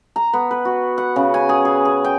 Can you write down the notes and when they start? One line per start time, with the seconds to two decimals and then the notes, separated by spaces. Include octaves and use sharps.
0.16 A#5
0.33 B3
0.51 B4
0.65 F#4
0.98 F#5
1.16 C#3
1.34 G#5
1.49 G#4
1.65 G#4
1.85 G#4
2.05 G5